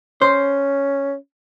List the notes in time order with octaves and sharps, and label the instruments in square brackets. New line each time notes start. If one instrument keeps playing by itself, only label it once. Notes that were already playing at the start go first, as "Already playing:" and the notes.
[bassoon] C#4 [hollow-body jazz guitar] C5